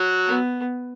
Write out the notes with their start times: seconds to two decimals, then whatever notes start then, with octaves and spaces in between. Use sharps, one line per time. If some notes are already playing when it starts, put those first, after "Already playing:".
Already playing: F#3 F#4
0.26 B3